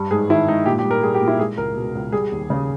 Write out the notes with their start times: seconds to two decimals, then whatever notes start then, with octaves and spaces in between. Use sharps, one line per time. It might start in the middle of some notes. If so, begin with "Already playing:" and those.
Already playing: G2 G3
0.11 G#2 G#4
0.29 D#3 E4
0.48 G#2 D#4
0.66 A#2 G4
0.79 G4
0.85 G3
0.91 A#4
1.03 G3 G#4
1.14 G4
1.21 A#2
1.28 E4
1.39 G#3 G#4
1.57 C#2 A#4
1.76 B2
1.95 C#2
2.12 G3 G#4
2.32 D#2
2.50 C#3